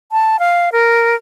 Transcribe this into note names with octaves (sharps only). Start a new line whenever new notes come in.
A5
F5
A#4